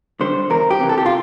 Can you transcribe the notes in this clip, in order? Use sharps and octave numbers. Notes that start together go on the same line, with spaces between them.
D3 G3 C5
E2 A#4
G4
C3 E3
A4
G4
F4